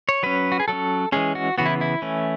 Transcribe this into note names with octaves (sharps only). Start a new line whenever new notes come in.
C#5
F#3 C#4 B4
F#4
G#4
F#3 C#4 A4
E3 G#3 C#4 G#4
F#4
C#3 E3 B3 F#4
E4
E4
E3 A3 C#4